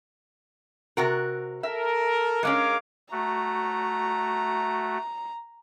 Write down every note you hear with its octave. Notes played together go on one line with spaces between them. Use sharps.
C3 F#4 A#4
A4 A#4 E5
G#3 A#3 C#4 A#4 F5 D6
A3 F#4 A#5